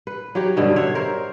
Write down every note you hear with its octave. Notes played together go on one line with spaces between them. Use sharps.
B4
F#3 F#4 G4 C#5
G2 B2 D3 C#4
C5 C#5 E5 F#5
A#4 C5